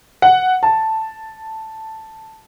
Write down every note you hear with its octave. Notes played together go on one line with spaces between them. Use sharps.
F#5
A5